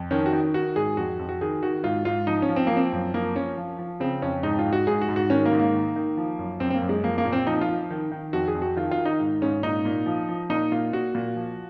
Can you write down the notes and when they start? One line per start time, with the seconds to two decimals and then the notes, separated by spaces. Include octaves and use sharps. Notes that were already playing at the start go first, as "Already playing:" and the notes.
Already playing: F2
0.11 D#3 C#4
0.26 F#4
0.33 D#3
0.54 D#3 F#4
0.76 G#2 G#4
0.97 F2 F#4
1.19 F2
1.29 F#4
1.41 D#3 G#4
1.62 D#3 F#4
1.84 G#2 F4
2.05 G#2 F4
2.27 F3 D#4
2.42 C#4
2.49 F3
2.56 C4
2.67 F3 A#3
2.77 C4
2.92 F#2
3.14 F3 A#3
3.35 F3 C#4
3.57 F3
3.79 F3
4.00 C#3 C4
4.22 F2 C#4
4.43 G#2 D#4
4.59 F4
4.65 G#2
4.73 F#4
4.87 G#2 G#4
5.01 F#4
5.09 G#2
5.16 F#4
5.30 D#3 C#4
5.45 A#3
5.52 G#2
5.59 A#3
5.74 D#3
5.96 D#3
6.17 F3
6.39 F#2
6.60 F#2 C4
6.70 C4
6.75 A#3
6.82 F#2
6.89 G#3
7.04 F3 A#3
7.18 A#3
7.25 A#2
7.32 C4
7.46 F3 D#4
7.61 F4
7.69 F3
7.90 D#3
8.11 D#3
8.33 F2 F#4
8.48 G#4
8.55 F2
8.62 F#4
8.76 D#3 F4
8.91 F4
8.98 D#3
9.05 D#4
9.20 G#2
9.42 G#2 C#4
9.63 A#2 D#4
9.85 A#2
10.06 F3
10.29 F3
10.50 A#2 D#4
10.72 A#2 F4
10.93 A#2 F#4
11.15 A#2
11.36 F3